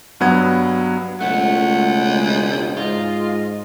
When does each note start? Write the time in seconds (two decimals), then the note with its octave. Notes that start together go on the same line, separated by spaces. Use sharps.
0.20 G2 F#3 B3 F#5 G#6
1.21 E1 C#2 A3 F#5
2.77 G#2 F4 D#5